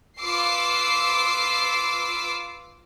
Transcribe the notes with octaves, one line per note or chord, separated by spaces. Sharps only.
F4 B4 D6 E6 C7